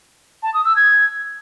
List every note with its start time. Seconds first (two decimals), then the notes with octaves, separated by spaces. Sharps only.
0.43 A5
0.54 D#6
0.65 E6
0.76 G#6